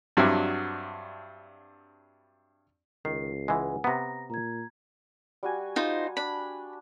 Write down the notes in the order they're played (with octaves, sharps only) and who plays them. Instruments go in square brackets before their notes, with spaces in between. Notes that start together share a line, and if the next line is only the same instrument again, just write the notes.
[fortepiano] G2 F#3 C4 D4 E4 F#4
[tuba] C#2 [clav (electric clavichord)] D#3 [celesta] C7
[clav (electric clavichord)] E3 G#3 [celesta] B4 F#5 G#5
[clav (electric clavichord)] C3 B3 [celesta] A#5 A#6
[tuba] A#2 [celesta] A#5 G#6
[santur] G3 F#4 G#5
[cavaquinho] D#4 F4 C5
[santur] D4 [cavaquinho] B5